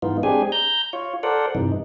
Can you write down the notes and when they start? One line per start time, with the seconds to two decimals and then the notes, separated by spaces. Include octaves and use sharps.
0.02 G#2 E3 B3 D#4 F4
0.23 G#3 C4 D4 G4 G#4 G#5
0.52 A#5 G6
0.93 F4 C#5
1.23 A4 A#4 C5 D5 F#5
1.55 G2 C3 E3 D#4